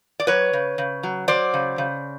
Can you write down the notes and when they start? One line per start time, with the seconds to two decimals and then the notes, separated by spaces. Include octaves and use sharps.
0.20 D5
0.27 F#3 B4 C#5
0.53 C#3
0.78 C#3
1.03 F#3
1.28 F#3 C5 D5
1.54 C#3
1.78 C#3